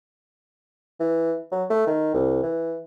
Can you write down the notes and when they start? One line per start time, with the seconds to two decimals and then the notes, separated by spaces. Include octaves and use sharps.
1.00 E3
1.52 F#3
1.70 A3
1.87 D#3
2.14 C2
2.43 E3